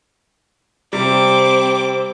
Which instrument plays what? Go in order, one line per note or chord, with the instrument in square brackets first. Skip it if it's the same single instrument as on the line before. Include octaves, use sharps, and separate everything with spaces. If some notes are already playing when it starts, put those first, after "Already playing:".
[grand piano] C3 G3 [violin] C4 D6